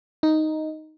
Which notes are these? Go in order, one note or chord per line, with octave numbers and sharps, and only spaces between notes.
D#4